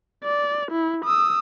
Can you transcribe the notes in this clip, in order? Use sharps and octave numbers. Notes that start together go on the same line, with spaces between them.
D5
E4
D#6 E6